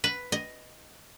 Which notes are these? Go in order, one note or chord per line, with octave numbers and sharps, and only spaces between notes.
B4
D#5